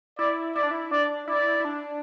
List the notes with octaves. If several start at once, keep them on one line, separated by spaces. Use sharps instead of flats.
E4 D5
E4 D5
D4
E4
D4 D5
E4 D5
E4
D4